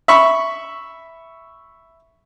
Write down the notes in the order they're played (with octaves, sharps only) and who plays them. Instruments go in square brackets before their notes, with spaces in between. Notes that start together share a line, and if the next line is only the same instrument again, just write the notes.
[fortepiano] E5 B5 C#6